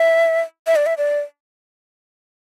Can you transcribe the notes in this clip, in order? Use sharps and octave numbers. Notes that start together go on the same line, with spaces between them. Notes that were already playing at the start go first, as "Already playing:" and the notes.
Already playing: E5
E5
D5
E5
D5